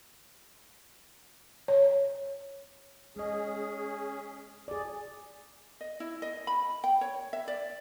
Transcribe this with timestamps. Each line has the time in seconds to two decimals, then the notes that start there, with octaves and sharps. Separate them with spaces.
1.68 C#5
3.16 G#3 C#4 G#4 D#5
4.68 G#4 D5
5.81 D#5
6.00 E4
6.22 D#5
6.47 B5
6.84 G5
7.01 C#5
7.33 E5
7.48 D5